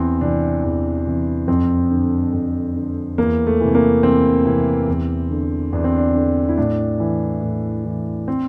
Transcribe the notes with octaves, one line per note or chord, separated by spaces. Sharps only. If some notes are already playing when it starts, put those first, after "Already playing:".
Already playing: E2 C4
C3 E3 D4
E2
C3 E3
F2 C4
D3
F2
D3
E2 A#3
A3
C3 E3
A#3
E2 C4
C3 E3
E2
D3
E2 D4
C4
D4
D3
E4
A2 D4
E3
A2
E3
C4